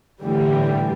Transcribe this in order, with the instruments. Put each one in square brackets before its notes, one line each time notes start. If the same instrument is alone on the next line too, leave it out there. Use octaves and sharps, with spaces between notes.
[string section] A2 D3 E3 G3